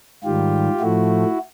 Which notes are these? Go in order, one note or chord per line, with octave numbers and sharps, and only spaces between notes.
G#2 D#3 G3 F4 G4
A2 F3 A3 E4 F#4